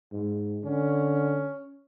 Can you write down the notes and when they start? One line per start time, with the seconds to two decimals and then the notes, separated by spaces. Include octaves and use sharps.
0.12 G#2
0.65 D3 C#4